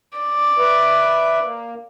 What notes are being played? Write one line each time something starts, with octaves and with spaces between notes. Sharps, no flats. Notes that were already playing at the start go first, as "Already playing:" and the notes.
D5
B4 E5
A#3